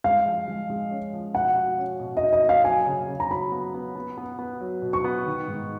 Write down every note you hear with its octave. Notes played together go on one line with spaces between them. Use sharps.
G#3 F5
F3
G#3
G#3
C#4
F3
B2 F#5
F#4
C#4
B2
F#4 D#5
D#5
A#3
F5
F#3 G#5
C#3
C#3
A#5
F#3 B5
B3
B3
B3
B3
B3
F#3
B2
C#6
B3
D#3
G#2